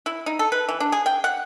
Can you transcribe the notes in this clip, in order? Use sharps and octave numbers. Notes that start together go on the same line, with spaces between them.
E4
D#4
A4
B4
E3
D4
G#4
G5
F#5